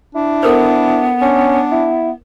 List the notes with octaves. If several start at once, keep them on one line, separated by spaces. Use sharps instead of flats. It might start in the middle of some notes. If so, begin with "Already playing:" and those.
D4 E4
B3 A4 A#4 C5
C#4 D4
E4